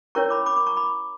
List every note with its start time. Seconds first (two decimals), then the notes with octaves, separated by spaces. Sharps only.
0.15 C#4 E4 A#4 C#5 A#5 C#6
0.30 B5 D6
0.46 B5 D6
0.56 B5 D6
0.66 A#5 C#6
0.77 B5 D6